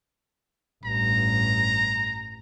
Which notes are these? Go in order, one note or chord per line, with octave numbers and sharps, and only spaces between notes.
A1 G2 A#5